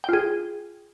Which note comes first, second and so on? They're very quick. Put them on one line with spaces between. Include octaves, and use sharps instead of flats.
G5 F4 G#4